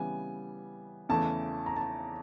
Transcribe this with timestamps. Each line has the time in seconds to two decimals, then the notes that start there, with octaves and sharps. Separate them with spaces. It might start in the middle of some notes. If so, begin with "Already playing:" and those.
Already playing: C#3 E3 G3 B3 G#5
1.09 E2 C#3 E3 A3 A5
1.66 A#5
1.76 A5